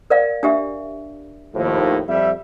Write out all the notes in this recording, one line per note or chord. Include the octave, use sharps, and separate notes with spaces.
A#4 D5 F5
D4 G4 E5
D#2 A2 F3
F2 G3 E5